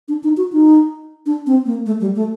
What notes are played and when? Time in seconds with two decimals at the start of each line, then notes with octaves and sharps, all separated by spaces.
0.08 D4
0.24 D#4
0.37 F#4
0.52 D#4
1.26 D4
1.46 C4
1.66 A#3
1.86 A3
2.01 G3
2.16 A3